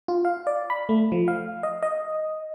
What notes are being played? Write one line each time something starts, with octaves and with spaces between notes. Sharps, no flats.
F4
F5
D5
B5
A3
F3
F5
D#5
D#5